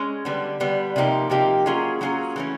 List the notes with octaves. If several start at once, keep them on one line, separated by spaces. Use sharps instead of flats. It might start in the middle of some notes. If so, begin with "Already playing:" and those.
Already playing: G#3 C#4
D3 G3 B3
D3 G3 B3
C3 F3 A#3 D#4 G4
C3 F3 A#3 D#4 G4
F#3 A#3 C#4 F4 G#4
F#3 A#3 C#4 F4 G#4
E3 A3 C#4